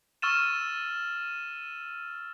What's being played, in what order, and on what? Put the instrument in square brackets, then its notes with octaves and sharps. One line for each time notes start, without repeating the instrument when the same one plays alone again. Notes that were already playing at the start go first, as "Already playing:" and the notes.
[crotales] C#6 E6 F6 A6 D#7 E7